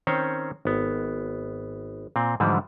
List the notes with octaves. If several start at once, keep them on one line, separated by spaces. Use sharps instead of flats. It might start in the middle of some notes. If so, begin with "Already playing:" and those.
D#3 C4 C#4 C5 C#5
G#1 B3
A#2 C4
G#2 D3 E3 F3 G3